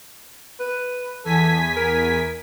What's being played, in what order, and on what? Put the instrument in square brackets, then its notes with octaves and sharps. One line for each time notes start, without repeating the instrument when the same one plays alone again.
[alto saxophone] B4
[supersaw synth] E2 G#5 B6 [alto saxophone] A4
[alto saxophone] A#4